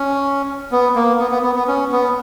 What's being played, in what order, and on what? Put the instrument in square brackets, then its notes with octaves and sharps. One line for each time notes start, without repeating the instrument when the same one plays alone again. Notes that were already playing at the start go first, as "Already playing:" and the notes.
Already playing: [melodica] C#4
B3
A#3
B3
B3
B3
B3
C#4
B3